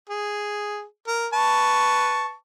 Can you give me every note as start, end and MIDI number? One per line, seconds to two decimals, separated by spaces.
0.09 0.84 68
1.07 1.27 70
1.33 2.33 71
1.33 2.33 81
1.33 2.33 85